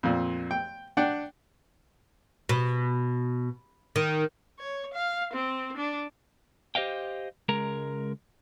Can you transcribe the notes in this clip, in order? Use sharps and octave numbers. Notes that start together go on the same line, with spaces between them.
F2 A#2
G5
D4 F#5 G5
B2
D#3
C#5
F5
C4
D4
G4 C5 D#5 F5 G5
C#2 G#3 A#4 A#5